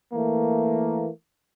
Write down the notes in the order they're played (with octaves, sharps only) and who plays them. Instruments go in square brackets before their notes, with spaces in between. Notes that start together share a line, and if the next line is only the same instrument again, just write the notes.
[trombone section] E3 A3 A#3